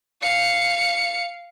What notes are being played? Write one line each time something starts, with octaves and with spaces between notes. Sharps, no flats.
F5 C#7